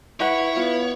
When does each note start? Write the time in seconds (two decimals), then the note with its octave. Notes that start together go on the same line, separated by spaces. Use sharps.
0.20 E4 B4 C#5 F#5
0.56 B3 F4